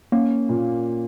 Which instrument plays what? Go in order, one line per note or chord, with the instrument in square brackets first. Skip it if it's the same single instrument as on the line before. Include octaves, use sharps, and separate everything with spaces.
[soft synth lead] A#3 [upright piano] C#4
[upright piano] A#2